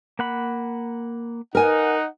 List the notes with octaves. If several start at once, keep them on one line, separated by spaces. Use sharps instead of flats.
A#3 F#5 B5
D#4 A#4 F#5 G#5